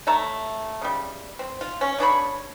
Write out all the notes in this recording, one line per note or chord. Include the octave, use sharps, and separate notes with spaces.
A3 C#5 E5 A#5
C#3 G3
C4
F4
C#4
C#3 D4 C#5 B5